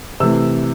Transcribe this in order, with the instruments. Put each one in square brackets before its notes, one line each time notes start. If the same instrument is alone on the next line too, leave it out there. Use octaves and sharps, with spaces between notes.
[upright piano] C3 E3 A3 E6